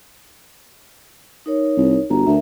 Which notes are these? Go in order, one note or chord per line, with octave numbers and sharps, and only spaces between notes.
D#4 A#4 C#5
C2
G1 F#4 A#5
D2 A#4 E5